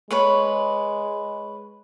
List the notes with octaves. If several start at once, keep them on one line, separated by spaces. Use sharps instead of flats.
G#3 B4 C#5 B5